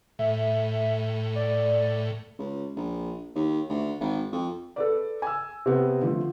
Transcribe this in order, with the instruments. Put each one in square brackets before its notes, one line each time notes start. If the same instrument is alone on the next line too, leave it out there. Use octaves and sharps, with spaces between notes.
[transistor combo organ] A2 [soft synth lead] E5
[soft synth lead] D5
[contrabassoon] C#2
A#1
D#2
D2
G#1
F2
[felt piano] A4 B4 D5
G#5 E6
C3 B3
D3 F3 A3